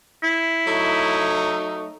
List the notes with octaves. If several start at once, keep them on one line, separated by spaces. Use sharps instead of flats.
E4
F#3 A3 D#4